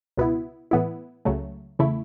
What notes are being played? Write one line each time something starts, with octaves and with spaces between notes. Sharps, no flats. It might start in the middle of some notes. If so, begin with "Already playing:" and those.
C#2 B2 B3 E4
A2 E3 B3 E4
C#2 C#3 F#3 A3
E2 C#3 A3 E4